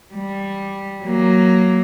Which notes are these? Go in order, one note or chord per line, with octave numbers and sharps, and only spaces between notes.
G3
F#3 A#3